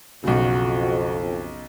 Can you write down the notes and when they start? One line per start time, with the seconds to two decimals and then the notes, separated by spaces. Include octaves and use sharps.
0.24 B1 F2 C#3 F#4